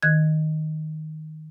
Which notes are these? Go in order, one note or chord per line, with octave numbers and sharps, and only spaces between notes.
D#3 F#6 G#6